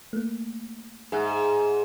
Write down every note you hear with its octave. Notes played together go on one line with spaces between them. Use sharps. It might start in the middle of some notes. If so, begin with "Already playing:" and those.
A3 A#3
G#2 G#4 E5 F#5